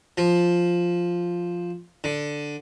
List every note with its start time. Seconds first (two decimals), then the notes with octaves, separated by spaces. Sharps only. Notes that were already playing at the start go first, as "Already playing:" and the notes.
0.18 F3
2.04 D3